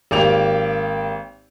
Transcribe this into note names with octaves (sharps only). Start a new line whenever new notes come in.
G#1 A#3 G4 G5 F7